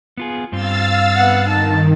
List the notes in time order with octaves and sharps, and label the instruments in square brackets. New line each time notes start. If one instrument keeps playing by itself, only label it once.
[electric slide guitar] B3 F4 G#4
[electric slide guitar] G2 C4 F4 [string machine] F5 E6 A6
[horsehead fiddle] B3 F#5
[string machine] D#3 [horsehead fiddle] D#4 A5